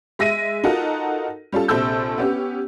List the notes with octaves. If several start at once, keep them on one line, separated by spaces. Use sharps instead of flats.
G#3 E5 A#6 B6 D#7
D#4 F4 F#4 A4 A#4 F#5
G3 C#4 F4 A4
A#1 C3 A4 E6 G6
B3 C#4 G4